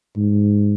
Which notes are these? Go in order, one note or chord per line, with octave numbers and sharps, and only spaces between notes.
G#2